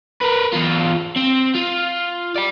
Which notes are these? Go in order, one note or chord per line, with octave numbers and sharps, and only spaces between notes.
A#4 B4
E2 F4
C4
F4
D5 G5